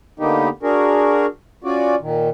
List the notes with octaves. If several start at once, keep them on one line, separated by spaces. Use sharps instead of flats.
D3 A#3 B3 D#4 G4
D4 F#4 G#4 A#4
C#4 F4 F#4 D5
A#2 D#3